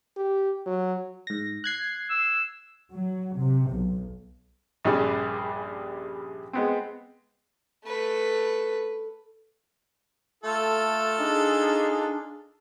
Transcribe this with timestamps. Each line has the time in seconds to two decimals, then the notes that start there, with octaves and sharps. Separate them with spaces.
0.17 G4
0.66 F#3
1.27 G#2 A#6
1.64 F#6 G#6 C7
2.10 E6
2.94 F#3
3.37 C3
3.70 B1
4.85 A#1 G2 C#3 G3
6.53 G#3 B3 C4
7.85 A3 B4
10.44 A3 F4 A4
11.18 D4 D#4 G#4